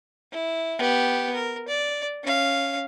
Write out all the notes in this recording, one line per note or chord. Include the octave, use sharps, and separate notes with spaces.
E4
B3 G4
A#4
D5
C#4 F5